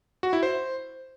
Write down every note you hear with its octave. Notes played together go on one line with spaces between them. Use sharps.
F#4
E4
C5